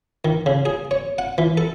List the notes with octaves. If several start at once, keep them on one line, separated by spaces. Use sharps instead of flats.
D#3
C#3
G#4
C#5
F#5
E3
A4